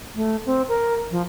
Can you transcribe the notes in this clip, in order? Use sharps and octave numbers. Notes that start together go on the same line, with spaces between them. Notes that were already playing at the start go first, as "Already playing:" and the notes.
A3
C4
A#4
F3